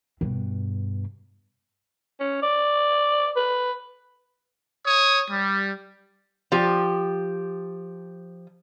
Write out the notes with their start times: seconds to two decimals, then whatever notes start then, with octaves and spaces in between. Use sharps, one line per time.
0.21 G2 B2
2.20 C#4
2.42 D5
3.36 B4
4.87 C#5 D#6
5.30 G3
6.52 F3 G4